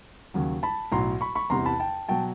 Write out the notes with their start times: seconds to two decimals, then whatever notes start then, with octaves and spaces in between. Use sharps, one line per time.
0.34 D#2 C#3 F#3
0.63 A5 B5
0.92 B1 A2 F#3 A#5 C6
1.21 B5 C#6
1.35 B5 C#6
1.50 E2 C3 E3 A#5 C6
1.66 A5 B5
1.80 G5 A5
2.08 B2 F#3 G5 A5